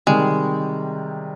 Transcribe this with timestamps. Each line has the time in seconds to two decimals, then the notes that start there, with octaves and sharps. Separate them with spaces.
0.07 C3 D#3 G3 G#3